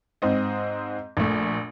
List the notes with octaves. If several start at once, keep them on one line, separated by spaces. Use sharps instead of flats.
G#2 C4 D#5
A#1 A3